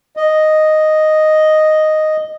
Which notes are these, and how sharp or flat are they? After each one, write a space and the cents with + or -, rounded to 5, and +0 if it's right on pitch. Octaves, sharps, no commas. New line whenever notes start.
D#5 +0